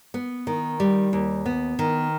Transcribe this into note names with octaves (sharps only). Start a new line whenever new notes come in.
B3
D#3
G3
D#2
B3
D#3